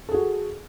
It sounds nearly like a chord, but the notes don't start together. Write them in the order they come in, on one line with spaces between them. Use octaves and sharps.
A4 G#4 F#4